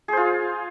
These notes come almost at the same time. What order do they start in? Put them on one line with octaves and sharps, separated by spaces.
G#4 C5 F4